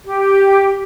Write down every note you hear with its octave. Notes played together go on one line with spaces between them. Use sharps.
G4